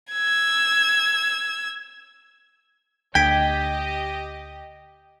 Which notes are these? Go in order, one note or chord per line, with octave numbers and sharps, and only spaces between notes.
E6 G#6
D2 G4 D#5 G5 G#6 B6 D7